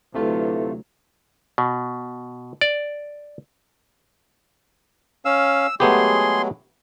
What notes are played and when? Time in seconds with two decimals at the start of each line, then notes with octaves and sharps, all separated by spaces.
0.14 D2 C3 F#3 A3 E4 F4 A4 B4
1.58 B2
2.61 D5
5.25 C#4 F5 E6
5.80 F#3 G#3 A3 B3 G4 G#4 C6